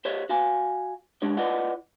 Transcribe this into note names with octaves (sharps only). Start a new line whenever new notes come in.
G4 C5 C#5 D#5
F#4 F5 G#5
G#3 D4 G4 C#5
E4 F4 B4 D5 D#5 F#5